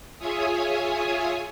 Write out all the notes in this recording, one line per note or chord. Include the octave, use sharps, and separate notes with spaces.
F4 G#4 C#5 E5 G#5 D#6